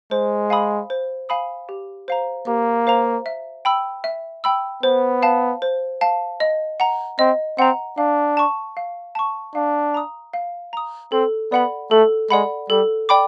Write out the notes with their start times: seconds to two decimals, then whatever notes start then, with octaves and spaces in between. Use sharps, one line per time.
0.11 G#3 C5
0.50 F5 G#5 B5 D#6
0.90 C5
1.29 F5 G#5 B5 D#6
1.69 G4
2.08 C5 F5 A#5
2.47 A#3 G4
2.87 C5 F5 A#5
3.26 E5
3.65 G5 B5 E6
4.04 E5
4.44 G5 B5 E6
4.83 B3 C5
5.23 F5 A5
5.62 C5
6.01 F5 A5
6.40 D#5
6.80 F#5 A#5
7.19 C4 D#5
7.58 C4 F#5 A#5
7.98 D4 F5
8.37 A5 C#6
8.77 F5
9.15 A5 C#6
9.55 D4 F5
9.94 A#5 D#6
10.33 F5
10.73 A#5 D#6
11.12 C4 A4
11.52 B3 D5 F#5 B5
11.91 A3 A4
12.30 G#3 D5 F#5 B5
12.69 G3 A4
13.09 D5 G5 B5 D6